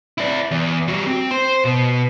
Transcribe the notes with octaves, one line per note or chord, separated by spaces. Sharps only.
E4 D5
E2
G3 F#4
C4
C5 C6
B2